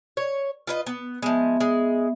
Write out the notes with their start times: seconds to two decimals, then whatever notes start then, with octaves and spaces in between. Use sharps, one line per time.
0.17 C#5
0.67 F4 B4 D#5
0.86 B3
1.22 F3 G#3 B3 E5
1.60 G#3